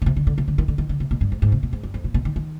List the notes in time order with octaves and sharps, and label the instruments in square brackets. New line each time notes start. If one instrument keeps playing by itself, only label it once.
[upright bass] D3
C3
D3
D3
C3
D3
D#3
D3
D#3
D3
C3
B2
G2
G#2
G#2
C3
B2
G#2
G2
F2
B2
B2
D#3
D#3